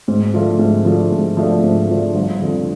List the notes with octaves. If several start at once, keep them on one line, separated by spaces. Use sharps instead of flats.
G#2
F3 A3 D4 F4
G#2
F3 A3 D4 F4
G#2
F3 A3 D4 F4
G#2
F3 A3 D4 F4
G1
F2 D3 F3